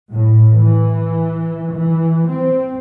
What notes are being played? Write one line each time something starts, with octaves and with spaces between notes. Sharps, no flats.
A2
E3
E3
C4